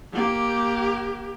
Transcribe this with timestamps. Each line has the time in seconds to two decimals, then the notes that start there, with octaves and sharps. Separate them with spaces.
0.12 A#3 G4